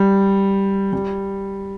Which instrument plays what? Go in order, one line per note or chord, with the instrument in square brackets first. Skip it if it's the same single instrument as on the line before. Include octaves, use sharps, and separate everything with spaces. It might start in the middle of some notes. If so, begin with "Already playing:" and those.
Already playing: [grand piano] G3
G3